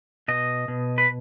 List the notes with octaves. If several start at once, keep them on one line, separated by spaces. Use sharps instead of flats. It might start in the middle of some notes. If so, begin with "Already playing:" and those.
B2 D#5
B2
B4